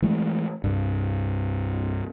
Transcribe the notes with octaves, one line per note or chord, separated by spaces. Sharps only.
E3 G#3 A3
C2 G2